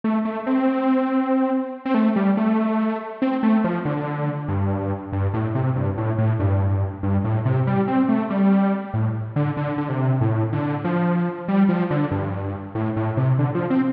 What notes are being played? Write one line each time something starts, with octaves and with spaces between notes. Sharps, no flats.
A3
A3
C4
C4
A3
G3
A3
C4
A3
F3
D3
G2
G2
A2
C3
G2
A2
A2
G2
G2
A2
C3
G3
C4
A3
G3
A2
D3
D3
D3
C3
A2
D3
F3
G3
F3
D3
G2
A2
A2
C3
D3
F3
C4